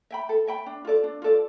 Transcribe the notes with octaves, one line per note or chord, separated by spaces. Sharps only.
E5 G5 B5
A4
E5 G5 B5
D4
F4 A4 D5
D4
F4 A4 D5